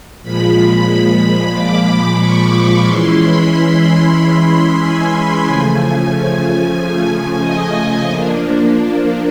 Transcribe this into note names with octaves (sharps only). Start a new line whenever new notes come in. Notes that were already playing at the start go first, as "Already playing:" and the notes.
A#2 F3 G#3 B5
D6
C#6
E3 G#3 C#4 E4 C6
B5
G#5
C#3 F3 A3
D#5
F3 A#3 D4